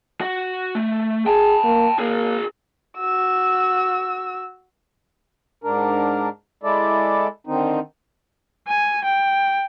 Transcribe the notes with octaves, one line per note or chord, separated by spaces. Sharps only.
F#4 F#5
A3
G#4 G5 A5
A#3
A#3 G#4 A#4
F#4 E6
G#2 D4 A#4
G#3 E4 A4 D5
D3 D#3 C4 D#4
G#5
G5